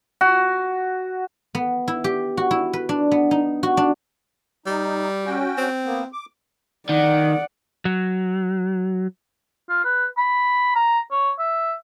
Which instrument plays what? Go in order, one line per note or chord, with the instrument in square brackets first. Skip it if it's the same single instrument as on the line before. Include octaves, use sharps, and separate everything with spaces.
[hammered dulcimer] F#4
[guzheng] B3
E4
G4
F#4
E4
B4
D4
B3
D#4
F#4
D4
[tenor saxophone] G3 [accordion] D#4
[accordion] C#4 F#4 G5
[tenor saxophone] C4
[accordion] A#3 B3
D6
[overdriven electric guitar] D#3 [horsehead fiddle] D5 F#5
[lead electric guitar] F#3
[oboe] F4
B4
B5
A#5
C#5
E5